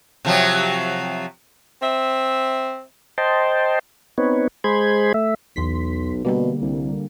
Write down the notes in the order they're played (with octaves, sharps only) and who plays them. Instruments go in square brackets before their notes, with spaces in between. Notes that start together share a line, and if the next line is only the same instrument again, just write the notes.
[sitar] C3 F3 F#3
[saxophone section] C4 E5
[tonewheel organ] C5 D#5 G5 A5 C6
B3 C4 D#4 B4 C#5
G#3 G#4 C5 B5 C6 G#6
A3 E5
[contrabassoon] B1 [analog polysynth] E2 C6 B6
[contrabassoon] B2 [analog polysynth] D3 G3 A#3
[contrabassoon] C2